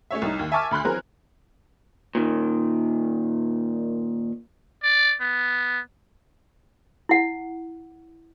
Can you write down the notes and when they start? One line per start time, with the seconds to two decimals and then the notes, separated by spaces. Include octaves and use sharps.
0.11 A3 C#4 C#5 E5
0.22 C2 D#4
0.39 D#2
0.52 E5 G#5 A5 C#6 D6 F6
0.71 D2 B5 C6 F#6
0.84 E3 F#3 C4 G#4 A#4
2.15 A#2 D#3
4.83 D5
5.21 B3
7.09 E4 F#5